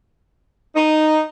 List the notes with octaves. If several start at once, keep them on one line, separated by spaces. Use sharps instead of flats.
D#4